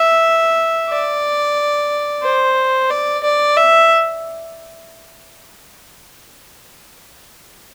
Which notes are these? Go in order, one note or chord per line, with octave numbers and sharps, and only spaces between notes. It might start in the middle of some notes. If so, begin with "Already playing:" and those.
Already playing: E5
D5
C5
D5
D5
E5